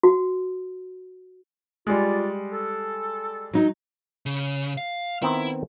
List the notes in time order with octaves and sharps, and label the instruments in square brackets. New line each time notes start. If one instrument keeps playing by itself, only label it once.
[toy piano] F#4
[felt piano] G3 G#3 [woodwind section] F4 D5
[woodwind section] A4
[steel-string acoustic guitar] F#3 D#4
[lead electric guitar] C#3
F5
[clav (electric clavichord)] D#3 B3 C4 [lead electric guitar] E4